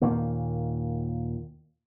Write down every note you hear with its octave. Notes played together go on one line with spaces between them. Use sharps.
D#2 A#2 D#3 A#3